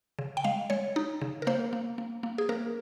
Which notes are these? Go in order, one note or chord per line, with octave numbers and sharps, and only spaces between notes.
C#3
G5
G#3 F5
G#3 C#5
D#4
C#3
A#4
A#3 C5
A#3
A#3
A#3
G#4
A#3 A#4